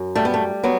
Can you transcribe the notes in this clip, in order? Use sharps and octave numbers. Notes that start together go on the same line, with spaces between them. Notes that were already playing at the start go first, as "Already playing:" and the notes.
Already playing: F#2
G3 A3
B3
A3
F#3 B3